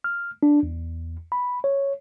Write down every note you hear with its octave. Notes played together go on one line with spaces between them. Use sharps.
F6
D4
E2
B5
C#5